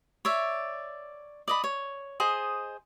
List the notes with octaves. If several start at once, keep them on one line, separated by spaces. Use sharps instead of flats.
C#5 D5 E5
D5 D#5 B5
C#5
G#4 C5 D#5